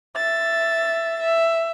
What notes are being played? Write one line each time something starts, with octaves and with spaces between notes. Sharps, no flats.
E5 A6
E5